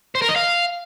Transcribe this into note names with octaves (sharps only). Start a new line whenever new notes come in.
C5
A#4
D#5
F5